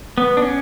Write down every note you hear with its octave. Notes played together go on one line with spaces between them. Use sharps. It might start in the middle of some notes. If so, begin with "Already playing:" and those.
B3
D4
C#4